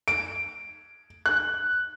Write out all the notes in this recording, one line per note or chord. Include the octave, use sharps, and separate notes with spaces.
D7
F#6